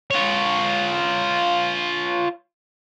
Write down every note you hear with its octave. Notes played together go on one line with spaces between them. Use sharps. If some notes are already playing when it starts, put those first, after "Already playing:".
F4 C#5